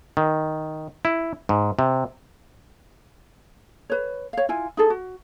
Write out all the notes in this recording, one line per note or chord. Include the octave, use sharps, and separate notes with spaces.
D#3
E4
G#2
C3
B4 C#5
C#5 F5
E4 F4 G#5
D#4 G#4 A4
F#4